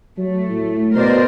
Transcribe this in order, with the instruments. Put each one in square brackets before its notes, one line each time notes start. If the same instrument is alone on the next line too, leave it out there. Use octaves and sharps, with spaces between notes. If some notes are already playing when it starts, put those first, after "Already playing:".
[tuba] F#3 [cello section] A3
[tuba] A2
[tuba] B2 [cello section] A#4 C5 D5